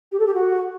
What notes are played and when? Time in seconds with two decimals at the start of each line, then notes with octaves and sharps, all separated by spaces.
0.12 G4
0.20 A4
0.27 G4
0.34 F#4